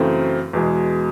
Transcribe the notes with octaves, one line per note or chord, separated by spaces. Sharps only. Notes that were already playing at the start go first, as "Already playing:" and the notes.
Already playing: F#2 C#3 E3 A3 C4
E2 B2 G#3